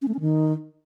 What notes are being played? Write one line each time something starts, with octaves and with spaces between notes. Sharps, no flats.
C#4
A3
C#4
D#3